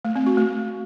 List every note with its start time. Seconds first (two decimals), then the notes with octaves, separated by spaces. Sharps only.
0.05 A3
0.16 C4
0.26 F#4
0.37 A3